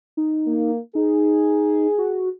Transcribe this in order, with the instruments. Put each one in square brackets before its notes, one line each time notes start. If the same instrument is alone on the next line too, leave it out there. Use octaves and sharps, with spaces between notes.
[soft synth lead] D#4
[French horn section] A#3
[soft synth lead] D#4 [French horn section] G#4
[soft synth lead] F#4